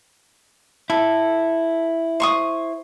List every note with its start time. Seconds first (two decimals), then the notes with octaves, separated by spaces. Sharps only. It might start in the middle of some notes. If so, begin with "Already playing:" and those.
0.90 E4 A4
2.20 C5 C#6 D#6